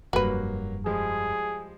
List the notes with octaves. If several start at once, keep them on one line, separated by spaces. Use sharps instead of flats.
F1 G2 F#3 A#3 F#4 B4
F3 G3 G#3 G#4